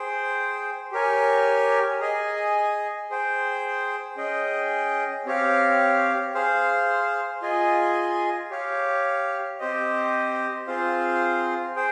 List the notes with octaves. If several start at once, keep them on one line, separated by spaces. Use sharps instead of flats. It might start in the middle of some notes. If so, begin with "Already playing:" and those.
Already playing: G#4 C5 G5
G4 A#4 C#5 G#5
G#4 D#5 G#5
G#4 C5 G5
C#4 G#4 D#5 G5
C4 G4 C#5 F5
G#4 C5 F5
F4 G#4 D#5 G#5
G4 C#5 F5
C4 G4 C5 D#5
C4 F4 G#4 C5 F5
G#4 C5 G5